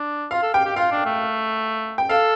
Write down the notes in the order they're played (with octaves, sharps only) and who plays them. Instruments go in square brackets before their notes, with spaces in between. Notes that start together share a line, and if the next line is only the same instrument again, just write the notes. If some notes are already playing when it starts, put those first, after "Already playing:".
Already playing: [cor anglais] D4
[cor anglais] F4 [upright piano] F5
[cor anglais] A4
[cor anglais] G4 [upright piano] G5
[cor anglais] G4
[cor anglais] F4 [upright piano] F5
[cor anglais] D4
A3
[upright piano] G5
[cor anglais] A4 [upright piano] F5